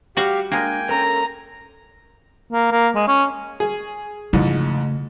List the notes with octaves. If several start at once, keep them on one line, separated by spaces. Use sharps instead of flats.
G3 F#4 G4 F5
G#3 A#3 D4 G5 G#5
C#4 A4 A#4 A#5
A#3
A#3
G#3
C#4
G#4
F2 G#2 C#3 E3 A3